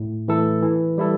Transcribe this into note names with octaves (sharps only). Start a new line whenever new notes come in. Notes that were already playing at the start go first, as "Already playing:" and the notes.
Already playing: A2
E3 A3 E4 A4
E3
G3 E4 A4